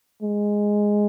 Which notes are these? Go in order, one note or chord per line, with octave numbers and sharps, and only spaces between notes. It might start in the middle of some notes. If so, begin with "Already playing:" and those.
G#3